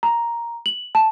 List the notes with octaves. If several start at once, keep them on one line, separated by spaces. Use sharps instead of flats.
A#5
F#7
A5